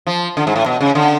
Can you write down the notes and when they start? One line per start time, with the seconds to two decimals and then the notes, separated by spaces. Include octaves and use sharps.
0.07 F3
0.37 D3
0.47 G#2
0.56 A2
0.66 B2
0.81 C#3
0.95 D3